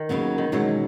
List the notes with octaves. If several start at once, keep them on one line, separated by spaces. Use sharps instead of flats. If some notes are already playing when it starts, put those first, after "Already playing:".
Already playing: D#3
D#2 C#3 F#3 B3
D#3
E2 B2 F#3 G#3 C#4 E4